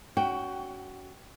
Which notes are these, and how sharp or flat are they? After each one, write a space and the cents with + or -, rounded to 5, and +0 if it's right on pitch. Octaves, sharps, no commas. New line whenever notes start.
C#4 +30 F#4 +15 G5 +0